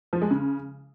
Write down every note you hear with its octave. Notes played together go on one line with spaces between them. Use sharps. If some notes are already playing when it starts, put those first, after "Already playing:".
F3
G#3
C#3